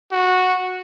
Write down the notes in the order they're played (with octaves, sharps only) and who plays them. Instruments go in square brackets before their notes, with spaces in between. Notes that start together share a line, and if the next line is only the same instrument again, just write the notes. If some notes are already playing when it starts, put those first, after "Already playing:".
[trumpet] F#4